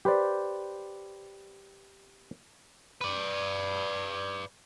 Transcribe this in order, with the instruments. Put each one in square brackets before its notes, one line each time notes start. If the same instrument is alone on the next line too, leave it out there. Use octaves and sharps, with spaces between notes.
[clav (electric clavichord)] G4 B4 C5 D5
[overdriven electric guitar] B4 D5